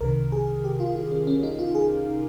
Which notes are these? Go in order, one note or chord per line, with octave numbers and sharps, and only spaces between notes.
C2 C3 D#3 A#4
G#4
G4
F4
F4
C#4
C#4
D#4
F4
G#4